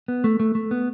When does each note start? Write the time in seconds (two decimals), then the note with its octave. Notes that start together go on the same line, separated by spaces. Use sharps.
0.08 B3
0.24 A3
0.40 A3
0.55 A3
0.71 B3